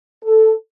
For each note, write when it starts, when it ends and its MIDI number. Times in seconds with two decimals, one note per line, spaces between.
0.24 0.53 69